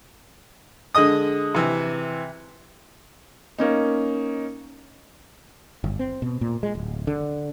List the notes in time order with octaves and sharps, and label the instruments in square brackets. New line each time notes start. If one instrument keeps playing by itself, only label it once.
[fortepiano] D3 G#3 D#5 D#6
C3 E3
[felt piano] A#3 C#4 D#4
[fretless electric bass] G1
C4
B2
A#2
G#3
D1
D3